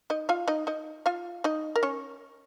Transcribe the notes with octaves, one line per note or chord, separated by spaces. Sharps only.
D#4 D#5
F4 F5
D#4 D#5
D#4 D#5
F4 F5
D#4 D#5
A#4
C#4 C#5